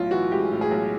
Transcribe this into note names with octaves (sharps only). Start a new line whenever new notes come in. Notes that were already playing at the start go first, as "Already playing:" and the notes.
Already playing: B1 A2 F4
E3 F#4
G#3 G4
A2
G#4
B1